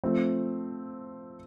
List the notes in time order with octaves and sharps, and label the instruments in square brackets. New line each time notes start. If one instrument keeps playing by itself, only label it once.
[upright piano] F3 A3 C4